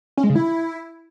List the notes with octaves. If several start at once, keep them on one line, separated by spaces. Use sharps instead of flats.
C#4
G#3
C#3
E4